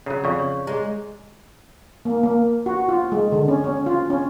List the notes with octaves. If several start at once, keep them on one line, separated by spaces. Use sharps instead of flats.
C#3 F#3 C#5 F#5 A#5
F2 C#3 D5 F5 C#6
C#5
G#3 G#4 C#5 A#5
A#3
A#3
F#4
F4
G#3
D3
C#4
C#4
F4
C#4